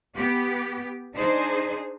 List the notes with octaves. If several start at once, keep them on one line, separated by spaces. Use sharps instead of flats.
B3 G4
D4 D#4 G#4 C5